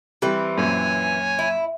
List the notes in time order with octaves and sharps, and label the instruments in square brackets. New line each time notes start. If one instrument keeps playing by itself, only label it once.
[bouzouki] E3 C4 [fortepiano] G3
[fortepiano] F#2 A#2 [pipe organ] C#5 G#5
[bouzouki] E4